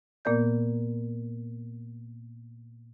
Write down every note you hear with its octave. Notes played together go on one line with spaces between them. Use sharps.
A#2 A#3 B3 A#4 D5 G6